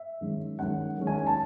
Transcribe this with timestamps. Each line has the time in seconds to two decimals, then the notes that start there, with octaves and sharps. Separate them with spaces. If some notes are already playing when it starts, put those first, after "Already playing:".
Already playing: E5
0.21 D#3 G#3 C#4
0.59 D#3 G#3 C#4 F#5
0.98 D#3 G#3 C#4
1.07 G#5
1.27 A5